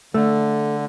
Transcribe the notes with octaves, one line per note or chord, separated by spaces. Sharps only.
D3 A3